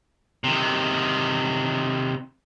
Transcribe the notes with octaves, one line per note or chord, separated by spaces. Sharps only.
C3 D#3